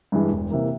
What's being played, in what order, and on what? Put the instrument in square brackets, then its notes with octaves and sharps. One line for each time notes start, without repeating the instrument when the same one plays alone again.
[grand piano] G2 E3 G#3
E1
C3 E3 A#3